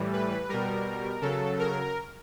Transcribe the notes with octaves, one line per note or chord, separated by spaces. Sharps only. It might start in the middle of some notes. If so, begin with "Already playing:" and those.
Already playing: A2 E3 G3
B4
B2 G3 A#4
C#3 F#3 A4
A#4